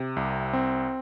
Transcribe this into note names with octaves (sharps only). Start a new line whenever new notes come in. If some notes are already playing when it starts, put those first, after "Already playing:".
Already playing: C3
C2
C4